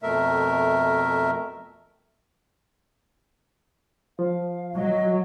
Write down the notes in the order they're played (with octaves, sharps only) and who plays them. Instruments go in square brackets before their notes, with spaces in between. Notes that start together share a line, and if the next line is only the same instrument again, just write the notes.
[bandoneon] F2 B2 A3 A#4 E5
[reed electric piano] F3 [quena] F5
[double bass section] F#3 [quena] D#5